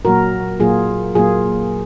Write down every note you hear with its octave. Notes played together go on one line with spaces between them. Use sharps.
A#2 F#3 A#3 F#4 A#4
A#2 F#3 A#3 F4 G#4
A#2 F#3 A#3 F4 G#4